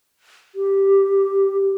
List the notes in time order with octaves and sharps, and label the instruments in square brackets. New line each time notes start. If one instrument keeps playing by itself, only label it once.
[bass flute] G4